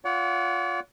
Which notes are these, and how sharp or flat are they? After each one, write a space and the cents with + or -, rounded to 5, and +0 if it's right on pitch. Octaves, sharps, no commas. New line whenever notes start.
F4 +5 D5 -45 F#5 +0